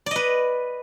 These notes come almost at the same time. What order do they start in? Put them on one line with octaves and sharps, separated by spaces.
D5 D#5 B4